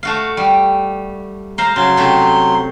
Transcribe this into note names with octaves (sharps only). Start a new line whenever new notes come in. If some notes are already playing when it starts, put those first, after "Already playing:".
A3 F#4 F5
G3
C5 F5 A#5
C#3 F#3 C6
C3 A3